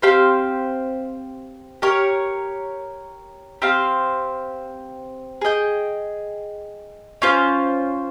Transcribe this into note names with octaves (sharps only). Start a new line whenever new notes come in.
C4 G4 C5 F5
G4 A#4 C#5
C4 G4 C5 F5
G#4 D#5 G5
C#4 F4 C5